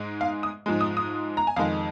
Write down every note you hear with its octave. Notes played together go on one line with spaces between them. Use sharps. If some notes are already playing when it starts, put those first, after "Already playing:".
Already playing: G#2 G#3
F5
D#6
G#2 F3 G#3
D#6
D#6
A#5
G#5
F2 D#3 G#3 F5